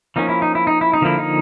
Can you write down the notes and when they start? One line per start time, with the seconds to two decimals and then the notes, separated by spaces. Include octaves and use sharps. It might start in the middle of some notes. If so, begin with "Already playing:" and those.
0.16 F3 A#3 C#4 D#4
0.29 E4
0.42 D#4
0.55 E4
0.67 D#4
0.81 E4
0.93 D#4
1.01 D3 F3 A#3 E4
1.19 D#4